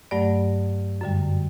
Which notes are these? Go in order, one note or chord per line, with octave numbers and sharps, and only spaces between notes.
G2 F#3 A3 D5
F#2 D3 G3